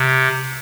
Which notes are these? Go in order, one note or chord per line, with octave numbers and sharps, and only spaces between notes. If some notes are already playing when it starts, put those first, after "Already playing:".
Already playing: C3